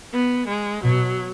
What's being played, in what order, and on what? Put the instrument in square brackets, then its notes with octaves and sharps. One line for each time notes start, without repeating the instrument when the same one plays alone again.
[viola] B3
G#3
[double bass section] B2 [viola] F#3